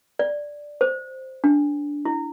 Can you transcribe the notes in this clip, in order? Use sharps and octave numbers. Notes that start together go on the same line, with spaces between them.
D5
C5
D4
E4